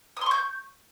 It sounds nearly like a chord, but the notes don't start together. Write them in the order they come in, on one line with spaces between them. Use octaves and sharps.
D#6 C6 C#6 G6